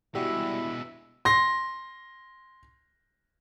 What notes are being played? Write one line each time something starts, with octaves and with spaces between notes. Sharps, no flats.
B2 G3 G#3 E4 F#4 G4 E6 B6
C6 A#6